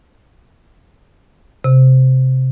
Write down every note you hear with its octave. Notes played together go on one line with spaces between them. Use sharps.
C3